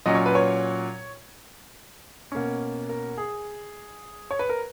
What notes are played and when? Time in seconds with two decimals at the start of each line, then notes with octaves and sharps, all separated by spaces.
0.06 A#2 F#3 C#4 D#5
0.15 C#5
0.26 B4
0.35 C#5
2.32 B2 A#3 C#4
2.89 A#4
3.18 G#4
4.31 C#5
4.39 B4
4.49 A#4